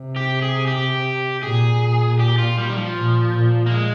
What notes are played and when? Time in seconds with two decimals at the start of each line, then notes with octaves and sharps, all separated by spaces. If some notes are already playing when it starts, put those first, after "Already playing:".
Already playing: C3
0.16 G4
0.42 G#4
0.67 G4
1.43 A#2 G#4
2.20 G4
2.38 F4
2.58 G3
2.69 D#3
2.76 F3
2.96 A#2
3.33 A#2
3.66 A#3
3.71 G#3